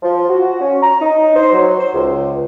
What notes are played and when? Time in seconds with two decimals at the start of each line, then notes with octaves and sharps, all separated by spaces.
0.02 F3
0.29 F#4
0.61 C#4
0.81 A#5
1.01 D#4
1.36 C5
1.52 F#3
1.78 C5
1.93 C#2